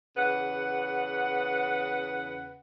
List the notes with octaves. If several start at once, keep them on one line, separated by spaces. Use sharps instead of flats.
E2 C#3 B4 F#5